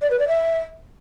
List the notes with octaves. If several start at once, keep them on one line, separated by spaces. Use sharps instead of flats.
D5
B4
D5
E5